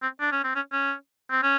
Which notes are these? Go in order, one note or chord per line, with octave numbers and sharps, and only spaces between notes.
C4
D4
C#4
C4
C#4
C#4
C4
C#4